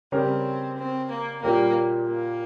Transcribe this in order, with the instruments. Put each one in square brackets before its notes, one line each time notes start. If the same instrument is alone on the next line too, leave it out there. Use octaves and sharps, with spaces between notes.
[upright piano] C#3 G3 C#4 G4 A#4 [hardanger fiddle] C4
[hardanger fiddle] C4
A#3
[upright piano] A#2 G3 C#4 G4 A#4 [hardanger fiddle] A#3
[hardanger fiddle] A#3